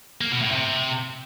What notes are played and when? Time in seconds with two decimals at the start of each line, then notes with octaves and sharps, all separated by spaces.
0.21 A#3
0.31 B2
0.41 A2
0.51 C3